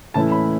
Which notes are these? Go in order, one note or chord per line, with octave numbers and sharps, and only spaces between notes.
A2 E3 A3 C#4 E4 A5
B5